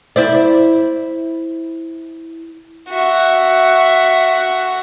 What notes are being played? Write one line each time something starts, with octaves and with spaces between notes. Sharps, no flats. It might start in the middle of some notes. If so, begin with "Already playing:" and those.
E4 C5 D5
F#4 E5